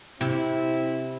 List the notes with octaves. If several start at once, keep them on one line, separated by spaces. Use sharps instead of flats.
C3 C4 E4